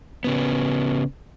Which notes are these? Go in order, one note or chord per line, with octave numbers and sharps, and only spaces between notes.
C#3 B3